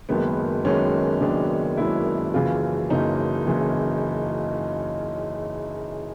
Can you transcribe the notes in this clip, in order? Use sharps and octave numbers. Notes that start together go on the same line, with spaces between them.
F#1 F#2 D#3 G#3 B3
F#1 F#2 D#3 G#3 B3 C#4
F#1 F#2 D#3 G#3 B3 D4
F#1 F#2 D#3 G#3 B3 E4
F#1 F#2 C#3 E3 F4
F#1 F#2 C#3 E3 D#4
F#1 F#2 C#3 E3